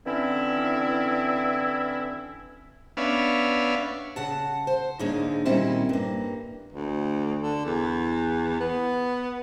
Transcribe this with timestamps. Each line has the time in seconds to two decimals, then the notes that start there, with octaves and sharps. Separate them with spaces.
0.07 D3 E3 C4 C#4 E4
2.97 B3 C#4 D4 E5 F5
4.16 C#3 F#5 A5
4.67 C5
4.99 G#2 D3 G#3 A#3 C#4 D#4
5.45 A#2 D#3 G3 C4 C#4 E4
5.89 G2 A#3
6.72 D2
7.42 D3
7.66 E2
8.60 B3